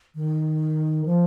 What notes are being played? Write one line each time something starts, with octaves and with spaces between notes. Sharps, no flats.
D#3
F3